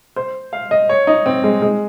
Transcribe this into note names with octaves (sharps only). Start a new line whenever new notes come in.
C5
F5
D#5
C#5
D#4
C4
G#3
G#3